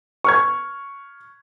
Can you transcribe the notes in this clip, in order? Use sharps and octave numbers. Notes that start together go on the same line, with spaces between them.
C#6 F6 G#6